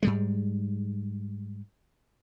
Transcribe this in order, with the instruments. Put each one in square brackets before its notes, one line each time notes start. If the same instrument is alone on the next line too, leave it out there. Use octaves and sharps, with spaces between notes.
[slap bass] G#2 G3 G#3